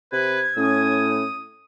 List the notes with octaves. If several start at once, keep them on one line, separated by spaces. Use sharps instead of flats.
C3 B4 G#6
A2 C#4 D#6